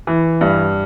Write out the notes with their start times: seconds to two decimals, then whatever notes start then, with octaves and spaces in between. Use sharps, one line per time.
0.07 E3
0.41 G2